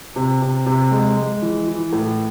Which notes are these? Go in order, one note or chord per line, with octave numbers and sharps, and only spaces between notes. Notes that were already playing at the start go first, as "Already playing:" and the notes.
C3
C3
C3
G#3
G#3
E3
E3
A2